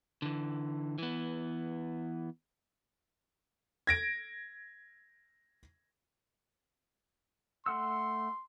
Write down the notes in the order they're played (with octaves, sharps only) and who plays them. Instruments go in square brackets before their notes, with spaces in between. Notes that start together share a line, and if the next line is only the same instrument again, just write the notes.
[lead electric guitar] D3 E3
E3 B3
[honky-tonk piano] G#6 A#6 D7
[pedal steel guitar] A3 F#5 E6 [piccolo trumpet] C6